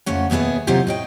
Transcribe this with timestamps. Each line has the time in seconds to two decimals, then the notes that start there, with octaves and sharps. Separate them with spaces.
0.06 F2 C#3 A3 C#4 F#5
0.30 D#2 B2 B3 G#4 E5
0.67 C3 F#3 C4 D#4 F4 G4
0.87 A2 D#5 G5